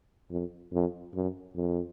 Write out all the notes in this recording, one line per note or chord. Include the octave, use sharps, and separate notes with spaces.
F2
F2
F#2
F2